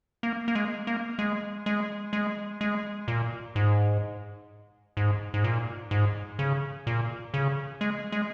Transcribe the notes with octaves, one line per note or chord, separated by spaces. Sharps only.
A#3
A#3
G#3
A#3
G#3
G#3
G#3
G#3
A#2
G#2
G#2
G#2
A#2
G#2
C#3
A#2
C#3
G#3
G#3